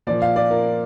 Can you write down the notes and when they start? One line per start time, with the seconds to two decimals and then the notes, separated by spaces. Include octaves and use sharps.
0.07 A#2 F3 D5
0.22 F5
0.36 D5
0.50 A#4